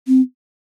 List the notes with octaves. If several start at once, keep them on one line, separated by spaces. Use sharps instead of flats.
C4